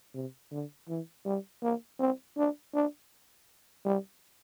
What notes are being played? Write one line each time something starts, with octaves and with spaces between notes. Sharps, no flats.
C3
D3
E3
G3
A#3
C4
D4
D4
G3